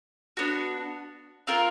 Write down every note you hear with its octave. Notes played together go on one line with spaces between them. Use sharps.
B3 D4 F#4
C4 F4 A#4